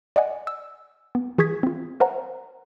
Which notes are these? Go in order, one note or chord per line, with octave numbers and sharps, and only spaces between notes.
D5 D#5 F#5 G#5
E6
B3
E3 G#4 C#6 D#6 G#6 B6
C4 F4
A#4 C5 C#5 E5 F#5 A#5